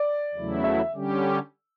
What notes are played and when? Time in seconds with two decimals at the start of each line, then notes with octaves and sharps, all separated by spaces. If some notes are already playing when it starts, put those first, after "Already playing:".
Already playing: D5
0.34 E2 C#3 F#3 A3 E4
0.64 E5
0.93 D3 G3 C#4 G4